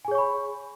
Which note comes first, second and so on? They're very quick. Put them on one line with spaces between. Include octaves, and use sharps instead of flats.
G#5 G#4 C#5 C#6 B5